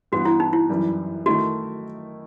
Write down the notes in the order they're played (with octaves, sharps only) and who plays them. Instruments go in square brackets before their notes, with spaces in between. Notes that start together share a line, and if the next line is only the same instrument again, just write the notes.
[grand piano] G2 E3 B3 [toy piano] F#4
[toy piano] E4
D#4
E4
[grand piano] F#2 E3 G3
[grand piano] D#3 A3 E4 [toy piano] F#4